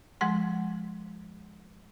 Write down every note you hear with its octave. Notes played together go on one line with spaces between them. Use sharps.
F3 G#3 F#5 C6